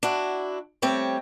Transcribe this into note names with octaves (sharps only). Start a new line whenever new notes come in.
D4 E4 F#4
G3 A3 C4 C#5 D5